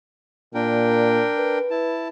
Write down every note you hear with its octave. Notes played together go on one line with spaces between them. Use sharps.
A#2 D4 A#4 G5
B4
E4 A5